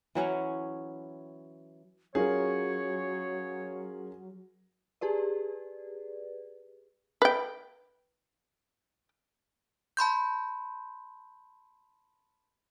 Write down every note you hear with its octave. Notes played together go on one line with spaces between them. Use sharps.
E3 F#3 C#4 C#5
F#3 C#4 F4 G#4 A#4 C#5
G4 G#4 B4 D5
B4 G5
A5 B5 C6 G6